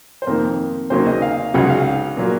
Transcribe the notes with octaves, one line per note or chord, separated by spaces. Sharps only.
C5
F2 D#3 A#3 A#4
D#2 C#3 F#3 A#3 C5
D#5
F5
C#2 C#3 F#3 F#5
F5
A#2 F#3 A#3